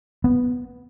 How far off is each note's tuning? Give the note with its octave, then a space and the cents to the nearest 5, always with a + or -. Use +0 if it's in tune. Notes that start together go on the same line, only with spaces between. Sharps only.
B3 +0